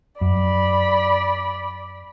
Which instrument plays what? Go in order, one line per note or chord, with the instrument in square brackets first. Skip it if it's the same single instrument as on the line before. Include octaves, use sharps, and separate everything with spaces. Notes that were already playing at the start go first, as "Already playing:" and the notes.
[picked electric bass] F#2 [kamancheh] D5 B5